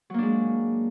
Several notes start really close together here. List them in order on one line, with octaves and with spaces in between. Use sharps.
F#3 A#3 D4 G#3